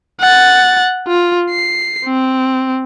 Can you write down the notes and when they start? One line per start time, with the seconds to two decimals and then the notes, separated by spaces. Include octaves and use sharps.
0.20 F#5 A6
1.08 F4
1.50 C7
2.05 C4